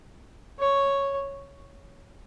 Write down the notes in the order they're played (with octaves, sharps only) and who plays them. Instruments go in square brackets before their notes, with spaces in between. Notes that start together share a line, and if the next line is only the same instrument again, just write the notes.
[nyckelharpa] C#5